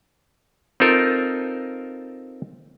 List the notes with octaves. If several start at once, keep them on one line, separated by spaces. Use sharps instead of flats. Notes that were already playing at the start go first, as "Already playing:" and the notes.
C4 D#4 F4 A4 A#4